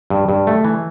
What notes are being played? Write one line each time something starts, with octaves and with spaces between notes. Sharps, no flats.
G2
G2
A3
E3